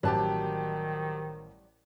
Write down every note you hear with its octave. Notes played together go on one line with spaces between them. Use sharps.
A1 D#3 F#3 G3 G4 C5 A5 F#6